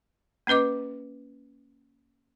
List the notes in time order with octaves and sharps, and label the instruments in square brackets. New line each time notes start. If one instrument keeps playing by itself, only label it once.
[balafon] A#3 C#4 B4 D#5 D6